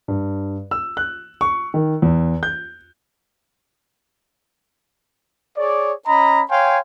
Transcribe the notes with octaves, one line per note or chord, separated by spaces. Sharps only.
G2
E6
F#6
C#6
D#3
E2
G6
G#4 C#5 D5
C#4 D#5 A#5 B5
C#5 F5 G5 G#5 C6